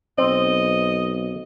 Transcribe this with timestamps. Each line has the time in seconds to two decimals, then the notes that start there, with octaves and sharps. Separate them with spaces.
0.18 B1 C4 D#5